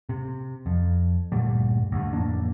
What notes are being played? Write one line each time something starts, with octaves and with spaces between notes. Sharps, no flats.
C3
F2
D2 G2 A#2 G3
D2 G2
A1 F2 A#3 D4